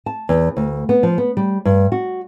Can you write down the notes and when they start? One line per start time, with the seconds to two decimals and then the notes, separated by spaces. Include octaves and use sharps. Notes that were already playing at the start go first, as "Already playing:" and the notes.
0.06 A5
0.29 E2
0.57 D2
0.89 B3
1.03 F3
1.18 B3
1.37 G3
1.65 G2
1.92 F#4